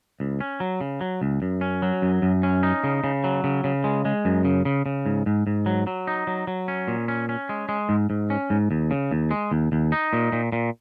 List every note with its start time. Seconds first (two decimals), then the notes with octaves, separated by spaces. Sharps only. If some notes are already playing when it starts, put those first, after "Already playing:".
0.20 C#2
0.41 C#4
0.60 F#3
0.81 C#3
1.01 F#3
1.21 C#2
1.42 F#2
1.61 C#4
1.82 F#3
2.02 F#2
2.22 F#2
2.43 C#4
2.63 D#4
2.84 C#3
3.04 C#3
3.24 F#3
3.44 C#3
3.64 C#3
3.84 G#3
4.05 G#3
4.25 F#2
4.45 C#3
4.65 C#3
4.86 C#3
5.06 G#2
5.26 G#2
5.47 G#2
5.66 F#3
5.87 F#3
6.07 D#4
6.27 F#3
6.47 F#3
6.68 C#4
6.88 A#2
7.08 C#4
7.29 C#4
7.49 G#3
7.69 G#3
7.89 G#2
8.10 G#2
8.30 C#4
8.50 G#2
8.71 D#2
8.91 C#3
9.11 D#2
9.31 G#3
9.52 D#2
9.72 D#2
9.92 D#4
10.13 A#2
10.32 A#2
10.52 A#2